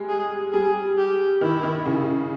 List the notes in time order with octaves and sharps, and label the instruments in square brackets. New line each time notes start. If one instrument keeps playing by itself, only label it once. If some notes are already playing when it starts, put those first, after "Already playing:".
Already playing: [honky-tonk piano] G3 G#3
[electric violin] G#4
[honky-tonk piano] G3 [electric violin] G#4
[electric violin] G4
[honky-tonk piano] D#3 [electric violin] E4
[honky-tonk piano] D#3
C#3